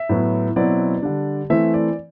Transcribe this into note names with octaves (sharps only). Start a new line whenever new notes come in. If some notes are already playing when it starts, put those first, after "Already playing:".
Already playing: E5
A2 F#3 B3
B2 F#3 C4 E4 D5
D3 G3 D4
E3 A3 C4 E4 E5
D5